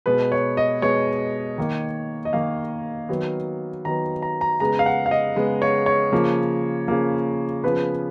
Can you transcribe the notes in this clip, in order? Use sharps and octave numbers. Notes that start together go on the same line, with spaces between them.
B2 G#3 B3 B4
C#5
D#5
B2 G#3 B3 C#5
D#3 A#3
D#5
D#3 A#3 F5
D#3 F#3 B3
D#3 F#3 B3 A#5
A#5
A#5
C#3 G#3 B3 A#5
F5
F#5
F5
D#5
C#3 G#3 B3
C#5
C#5
C#3 F3 A#3
C#3 F3 A#3
C#3 F3 B3 B4